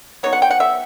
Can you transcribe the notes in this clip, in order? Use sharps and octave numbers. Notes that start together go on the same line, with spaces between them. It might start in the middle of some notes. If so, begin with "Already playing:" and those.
F#3 B3 D#4 C#5
F#5
G5
F#5
E5